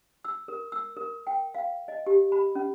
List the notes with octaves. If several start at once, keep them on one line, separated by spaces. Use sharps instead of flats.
E6
A#4
E6
A#4
G5
F5
D#5
G4
B5
C#4